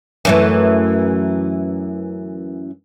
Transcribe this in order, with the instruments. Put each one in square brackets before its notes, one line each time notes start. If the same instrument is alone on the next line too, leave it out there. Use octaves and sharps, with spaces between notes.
[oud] F#2 E3 A3